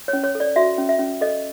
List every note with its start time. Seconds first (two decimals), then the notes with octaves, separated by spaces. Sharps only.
0.08 C#5
0.13 C#4
0.24 C#5
0.35 A4
0.40 D5
0.56 F#4 E5
0.78 C#4
0.89 E5
0.99 C#4
1.21 A4 D#5